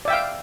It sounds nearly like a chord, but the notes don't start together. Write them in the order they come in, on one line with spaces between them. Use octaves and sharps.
D5 E5 G5 F5